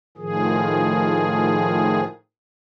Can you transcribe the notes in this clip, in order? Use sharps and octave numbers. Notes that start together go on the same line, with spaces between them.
A2 D#3 F3 G#4